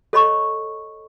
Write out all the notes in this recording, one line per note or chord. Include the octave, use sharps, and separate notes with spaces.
A4 C#5 D#5 B5 C#6